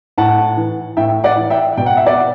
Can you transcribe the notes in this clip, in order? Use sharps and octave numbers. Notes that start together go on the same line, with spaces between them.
A2 F#5 A5
E3
A2 E5 G5
D5 F#5
E3
E5 G5
B2 G5
F#5
E5
D5 F#5